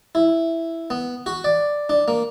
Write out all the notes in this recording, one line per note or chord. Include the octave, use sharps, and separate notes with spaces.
E4
B3
F#4
D5
D4
A#3